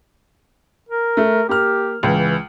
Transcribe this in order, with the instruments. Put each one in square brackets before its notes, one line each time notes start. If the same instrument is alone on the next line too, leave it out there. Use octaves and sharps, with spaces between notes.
[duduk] A#4
[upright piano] A3
[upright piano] A#3 F6 [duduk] G4
[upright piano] C#2 [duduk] E3